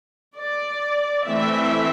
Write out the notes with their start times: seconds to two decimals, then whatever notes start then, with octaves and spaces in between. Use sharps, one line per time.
0.35 D5
1.26 E3 A3 C4 E5